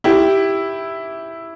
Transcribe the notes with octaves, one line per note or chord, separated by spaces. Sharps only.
E4 G4